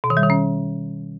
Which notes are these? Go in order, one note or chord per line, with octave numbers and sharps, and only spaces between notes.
B2
D#3
G3
D#3
C#4